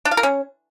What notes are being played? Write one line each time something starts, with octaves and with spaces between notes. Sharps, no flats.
D4
F5
A#4
C#4